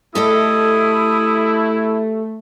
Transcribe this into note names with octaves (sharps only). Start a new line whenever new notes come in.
A3 E4 G4 A4 D#5 D#6